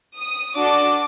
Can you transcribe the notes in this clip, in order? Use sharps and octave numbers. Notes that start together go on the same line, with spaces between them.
D#6
D4 F#4 A4 D6